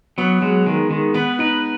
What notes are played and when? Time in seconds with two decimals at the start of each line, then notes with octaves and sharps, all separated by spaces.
0.18 F#3 B3
0.41 F#3 G#3
0.66 D#3 G#3
0.90 D#3 G#3
1.14 B3 B4
1.39 D#4 B4